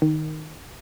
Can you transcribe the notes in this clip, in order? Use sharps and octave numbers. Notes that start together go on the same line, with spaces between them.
D#3